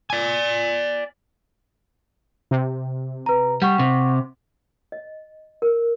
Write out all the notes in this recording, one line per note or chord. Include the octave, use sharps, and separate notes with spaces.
D5 G#5
C3
B4 A#5
G3 F#5 C#6
C3
D#5
A#4